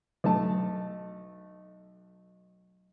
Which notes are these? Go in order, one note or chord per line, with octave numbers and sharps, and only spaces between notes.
B1 A3 A5